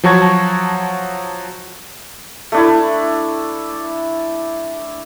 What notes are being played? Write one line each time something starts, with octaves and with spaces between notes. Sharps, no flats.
F3 F#3 F#4 A5 C#6 G#6
A3 D4 E4